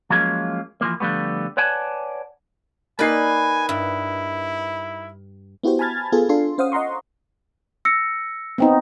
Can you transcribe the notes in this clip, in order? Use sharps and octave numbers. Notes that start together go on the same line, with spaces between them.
F3 F#3 G#3 A#3 C#4 F4
E3 F3 A#3
D3 F3 G3 A3 B3
B4 C#5 D5 F#5 G#5 A5
A#3 D#4 B4 D5 G#5 B5 C7
G2 E4
B3 E4 F#4 G4 C5
G#5 A5 B5 F6 G#6 A6
B3 F4 G#4 A4
D4 F4 A4 C6
C#4 C5 F5 F#5 D#6
D#5 F#5 A#5 C6 C#6
E6 A#6 C#7
B3 C4 D#4